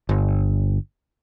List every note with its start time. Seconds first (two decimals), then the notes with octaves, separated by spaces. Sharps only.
0.09 G1